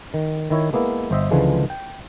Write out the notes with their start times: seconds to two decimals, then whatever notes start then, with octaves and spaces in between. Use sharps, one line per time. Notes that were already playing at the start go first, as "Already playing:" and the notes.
0.14 D#3
0.50 D#3 E4 C#5
0.73 G#3 A#3 B3 E4
1.11 G1 C5 D#5 E5
1.31 C#2 D3 E3 F3 G#3
1.70 G5